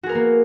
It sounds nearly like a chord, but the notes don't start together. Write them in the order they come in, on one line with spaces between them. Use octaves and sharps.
F#4 G#4 A#4 B3 A#3